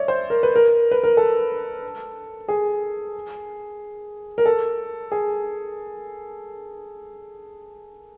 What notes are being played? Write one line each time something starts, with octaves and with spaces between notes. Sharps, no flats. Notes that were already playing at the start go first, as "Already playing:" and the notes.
Already playing: C#5 D5 E5
C5
A#4
B4
A#4
B4
A#4
A4
G#4
A#4
A4
G#4